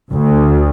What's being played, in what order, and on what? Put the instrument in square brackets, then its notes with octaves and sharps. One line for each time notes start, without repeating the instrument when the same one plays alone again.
[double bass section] D2